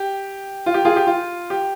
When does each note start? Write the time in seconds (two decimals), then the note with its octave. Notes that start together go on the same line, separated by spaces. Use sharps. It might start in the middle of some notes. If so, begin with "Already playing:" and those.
Already playing: G4
0.66 F4
0.74 G4
0.85 F4 G#4
0.96 G4
1.07 F4
1.50 G4